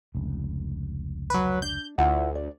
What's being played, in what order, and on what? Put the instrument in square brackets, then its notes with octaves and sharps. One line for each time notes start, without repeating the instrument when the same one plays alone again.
[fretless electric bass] F1 C#2
[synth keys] F#3 B4
[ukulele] D4 [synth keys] G6
[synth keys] D2 [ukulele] E4 F4 F#5
[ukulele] D5